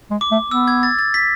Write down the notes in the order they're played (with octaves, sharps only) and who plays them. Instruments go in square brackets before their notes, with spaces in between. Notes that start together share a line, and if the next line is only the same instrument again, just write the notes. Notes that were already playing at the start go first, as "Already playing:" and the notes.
[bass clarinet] G#3
[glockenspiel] D6
[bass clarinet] A3
[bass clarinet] B3 [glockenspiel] E6
[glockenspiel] G#6
A6
A6
B6